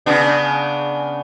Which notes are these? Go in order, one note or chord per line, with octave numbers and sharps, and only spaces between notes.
C#3 B3 D4